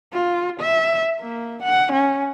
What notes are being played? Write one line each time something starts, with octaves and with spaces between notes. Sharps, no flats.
F4
E5
A#3
F#5
C#4